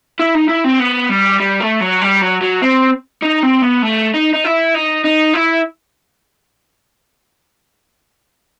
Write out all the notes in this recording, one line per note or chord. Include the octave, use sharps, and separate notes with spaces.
E4
D#4
E4
C4
B3
G3
G3
A3
F#3
G3
F#3
F#3
C4
D#4
C4
B3
A3
D#4
D#4
E4
D#4
D#4
E4